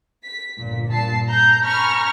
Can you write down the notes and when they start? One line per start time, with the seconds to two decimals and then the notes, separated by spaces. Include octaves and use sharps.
0.23 B6
0.58 G1 A#2
0.88 G2 A#2 A5 C7
1.28 A#5 G6
1.64 G#5 A#5 B5 C#6 F6